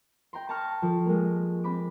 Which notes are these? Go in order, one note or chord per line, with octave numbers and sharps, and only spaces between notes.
G5 A#5 C6
A5 A#5 C6 C#6 F6
F3 A4
G#3 A#3
C4 B5 D6